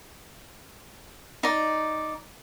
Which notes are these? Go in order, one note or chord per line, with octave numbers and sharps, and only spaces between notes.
D#4 D5